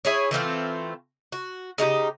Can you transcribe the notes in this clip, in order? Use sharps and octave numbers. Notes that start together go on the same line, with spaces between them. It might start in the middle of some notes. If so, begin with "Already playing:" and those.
E4 G#4 C#5
E3 A3 C4 F4
F#4
C#3 D#4 F#4 G4